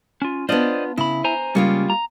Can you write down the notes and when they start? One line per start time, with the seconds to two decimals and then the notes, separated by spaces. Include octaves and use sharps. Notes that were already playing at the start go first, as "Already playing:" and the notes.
0.22 C#4 F4
0.49 B3 D4 F4 C5 D5 D#5
0.98 C#3 E4 B5
1.24 C5 G#5 A#5
1.55 C#3 G3 G#3 A#3 C#4 F4
1.90 A#5